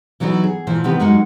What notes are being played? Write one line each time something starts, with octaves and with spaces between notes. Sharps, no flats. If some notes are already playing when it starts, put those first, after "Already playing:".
E3 F#3 B3 D#4 E4
G#4
A#2 E3 F3
C3 D#3 E3 B3 G4 B4
F#2 G#3 D#4 F#4 A#4 F#5